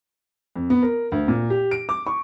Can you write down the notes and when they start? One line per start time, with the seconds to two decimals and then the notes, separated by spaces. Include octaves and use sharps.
0.56 F2
0.70 B3
0.82 A#4
1.12 D2
1.28 A#2
1.50 G4
1.71 D7
1.89 D6
2.07 C#6